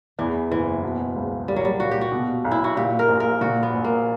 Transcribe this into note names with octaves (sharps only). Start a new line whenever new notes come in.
E2 E3
F#1 E3
B2
C#2
G3 A#3
F#3
G3
A#2 F#4
G4
F#4
B2
B1
E4
F#4
A#2 G4
A#4
A#1
A#4
A#2 F#4
B3
A#1
A#3